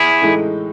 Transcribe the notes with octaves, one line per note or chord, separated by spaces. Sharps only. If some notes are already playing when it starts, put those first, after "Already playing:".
Already playing: E4 G#4
A2 E3 G#3 D#4 A4